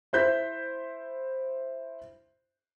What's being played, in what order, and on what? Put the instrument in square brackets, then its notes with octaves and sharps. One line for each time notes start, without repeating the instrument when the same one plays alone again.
[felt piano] E4 C5 G6 B6